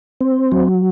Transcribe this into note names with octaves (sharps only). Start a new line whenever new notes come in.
C4
F#3